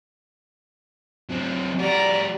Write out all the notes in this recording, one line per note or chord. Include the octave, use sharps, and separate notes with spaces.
F#3 C4
G3 F#4 D5 A#5